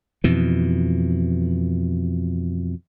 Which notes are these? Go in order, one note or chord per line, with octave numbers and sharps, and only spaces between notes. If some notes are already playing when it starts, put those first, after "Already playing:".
F2 B2 E3